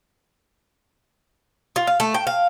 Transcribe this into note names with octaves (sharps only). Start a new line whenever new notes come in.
F4
F5
A3
G5
F5